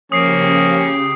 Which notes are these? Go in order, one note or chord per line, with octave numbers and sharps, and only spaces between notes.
C#3 F3 A#3 C#4 G4 D#6 C7 D7